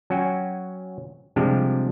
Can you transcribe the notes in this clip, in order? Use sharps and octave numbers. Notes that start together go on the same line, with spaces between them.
F#3 C#4 F#4 G5 G#5
C3 F3 G3 G#3 D4 G4